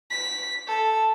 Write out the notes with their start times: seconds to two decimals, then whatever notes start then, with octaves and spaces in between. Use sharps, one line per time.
0.10 B6
0.68 A4